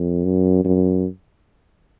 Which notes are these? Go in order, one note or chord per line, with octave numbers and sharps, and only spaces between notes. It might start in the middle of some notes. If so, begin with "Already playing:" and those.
Already playing: F2
F#2
F#2